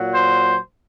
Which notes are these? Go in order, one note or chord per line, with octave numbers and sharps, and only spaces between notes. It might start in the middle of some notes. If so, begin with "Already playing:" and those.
Already playing: A#2 F#3
C5